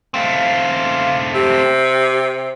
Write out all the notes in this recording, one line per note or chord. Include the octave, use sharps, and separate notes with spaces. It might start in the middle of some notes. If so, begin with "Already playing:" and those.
A3 C4 F5
C3 G4